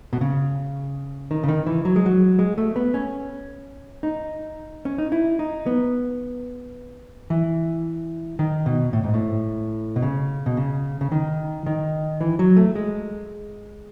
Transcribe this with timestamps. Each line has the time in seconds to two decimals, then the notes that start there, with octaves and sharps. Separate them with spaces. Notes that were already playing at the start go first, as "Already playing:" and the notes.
0.13 B2
0.21 C#3
1.31 D#3
1.43 C#3
1.48 D#3
1.67 E3
1.85 F#3
1.96 G#3
2.06 F#3
2.39 G#3
2.58 A3
2.76 B3
2.94 C#4
4.03 D#4
4.85 C#4
4.98 D#4
5.12 E4
5.39 D#4
5.66 B3
7.30 E3
8.39 D#3
8.66 B2
8.93 A2
9.04 G#2
9.14 A2
9.96 B2
10.02 C#3
10.46 B2
10.57 C#3
11.01 C#3
11.12 D#3
11.66 D#3
12.21 E3
12.39 F#3
12.57 A3
12.75 G#3